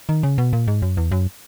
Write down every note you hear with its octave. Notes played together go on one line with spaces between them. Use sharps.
D#3
C#3
B2
A#2
G#2
F#2
E2
F#2